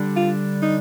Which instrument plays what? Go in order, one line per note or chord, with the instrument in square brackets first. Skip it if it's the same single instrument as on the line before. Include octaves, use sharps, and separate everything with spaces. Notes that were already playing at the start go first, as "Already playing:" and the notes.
Already playing: [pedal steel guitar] D3 G3 D4
[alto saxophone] F4
D#4